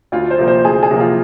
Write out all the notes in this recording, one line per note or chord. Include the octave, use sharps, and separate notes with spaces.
D2 F4
C5
C3 F3 A#3
C5
D2 G#4
G#4
C3 F3 A#3
F4